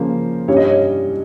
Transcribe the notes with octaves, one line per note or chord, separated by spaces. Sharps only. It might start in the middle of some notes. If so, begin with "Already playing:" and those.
Already playing: C#3 F3 A#3 C#4 C5
G2 G3 C#4 C#5
D#5
C#5